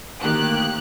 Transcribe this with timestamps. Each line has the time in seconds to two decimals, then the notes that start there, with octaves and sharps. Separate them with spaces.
0.21 D2 D#3 A#3 G4 F#6